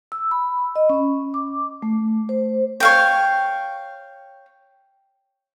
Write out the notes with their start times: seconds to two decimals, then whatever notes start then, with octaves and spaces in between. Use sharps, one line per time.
0.12 E6
0.31 B5
0.76 D#5
0.90 C#4
1.34 D6
1.82 A3
2.29 C5
2.80 C#5 F5 G5